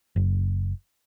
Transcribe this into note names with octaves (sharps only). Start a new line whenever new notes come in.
F#1